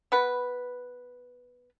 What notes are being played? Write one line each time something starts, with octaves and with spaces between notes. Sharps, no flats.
B3 B4